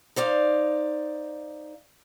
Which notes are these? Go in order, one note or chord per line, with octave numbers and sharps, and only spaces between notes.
D#4 C5 D5 F5